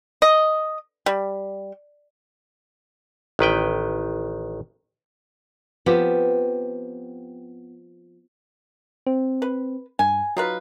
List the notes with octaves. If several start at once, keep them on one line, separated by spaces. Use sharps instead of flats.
D#5
G3
A1 D#3 B4 G5
F3 B3 C4 G4
C4
B4
G2 G#5
F#3 D#4 F4 B4